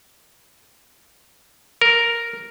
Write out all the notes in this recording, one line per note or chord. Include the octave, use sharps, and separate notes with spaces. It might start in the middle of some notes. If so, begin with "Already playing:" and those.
A#4